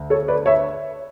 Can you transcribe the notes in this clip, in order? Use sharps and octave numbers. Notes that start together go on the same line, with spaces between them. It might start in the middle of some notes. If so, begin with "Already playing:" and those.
Already playing: D2
A4 C#5
B4 D5
C#5 E5